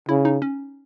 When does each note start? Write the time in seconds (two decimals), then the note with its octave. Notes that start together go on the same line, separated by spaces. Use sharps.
0.09 C#3 E4
0.25 D#4
0.42 C#4